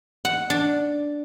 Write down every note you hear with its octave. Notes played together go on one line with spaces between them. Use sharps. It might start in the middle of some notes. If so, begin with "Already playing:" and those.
F#5
D4